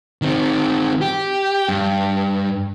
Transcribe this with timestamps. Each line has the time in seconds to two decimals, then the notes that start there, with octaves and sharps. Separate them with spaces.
0.22 D#3 C4
1.01 G4
1.69 G2